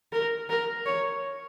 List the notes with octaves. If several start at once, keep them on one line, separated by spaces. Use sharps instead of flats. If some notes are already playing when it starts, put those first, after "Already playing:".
A#4
A#4
C#5